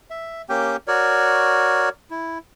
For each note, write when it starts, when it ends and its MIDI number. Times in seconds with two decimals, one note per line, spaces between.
0.11 0.42 76
0.49 0.76 58
0.49 0.76 61
0.49 0.76 67
0.49 0.76 79
0.88 1.89 66
0.88 1.89 70
0.88 1.89 73
0.88 1.89 74
2.11 2.38 64